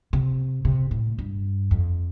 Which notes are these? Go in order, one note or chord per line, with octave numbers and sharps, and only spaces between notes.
C3
C3
A2
G2
F2